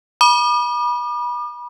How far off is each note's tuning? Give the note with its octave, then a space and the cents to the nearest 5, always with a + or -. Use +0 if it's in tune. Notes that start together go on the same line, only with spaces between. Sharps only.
B5 -30 D6 +45